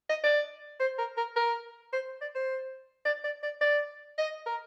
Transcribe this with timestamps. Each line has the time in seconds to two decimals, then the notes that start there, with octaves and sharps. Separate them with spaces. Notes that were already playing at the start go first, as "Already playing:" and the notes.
0.10 D#5
0.24 D5
0.80 C5
0.99 A#4
1.18 A#4
1.36 A#4
1.93 C5
2.21 D5
2.35 C5
3.06 D5
3.24 D5
3.43 D5
3.61 D5
4.18 D#5
4.47 A#4